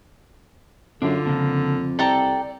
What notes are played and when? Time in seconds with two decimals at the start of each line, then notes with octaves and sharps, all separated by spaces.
1.02 F#2 D3 D4 F4
1.25 F2 C#3 A#3 D4
1.99 C2 A4 D5 G5 A#5